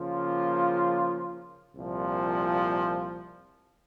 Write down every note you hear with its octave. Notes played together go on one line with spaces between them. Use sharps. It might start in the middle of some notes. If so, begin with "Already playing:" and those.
Already playing: C#3 F3 A#3 F4
C2 A#2 F3